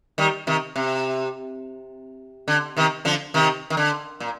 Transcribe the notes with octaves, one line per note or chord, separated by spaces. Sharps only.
D#3 G3
C3 D#3
C3
D3
C3 D#3
D3 F3
C3 D#3
D#3
D3
A#2